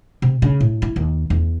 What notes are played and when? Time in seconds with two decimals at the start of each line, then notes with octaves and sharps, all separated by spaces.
0.22 C3
0.42 C#3
0.60 A2
0.82 E4
0.96 D#2
1.30 E2